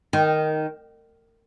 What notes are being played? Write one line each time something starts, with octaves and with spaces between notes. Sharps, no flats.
D#3